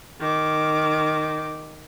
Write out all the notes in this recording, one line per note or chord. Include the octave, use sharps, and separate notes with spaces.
D#3 D6